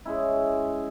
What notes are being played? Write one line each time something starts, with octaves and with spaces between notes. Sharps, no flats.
G#3 C#4 E4